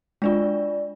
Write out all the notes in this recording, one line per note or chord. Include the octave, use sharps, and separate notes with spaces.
G#3 D4 F4 D5